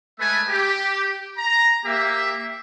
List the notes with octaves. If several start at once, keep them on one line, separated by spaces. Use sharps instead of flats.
G#3 A3 A4 B4 E5 G#5
G4
A#5
A#3 G4 E5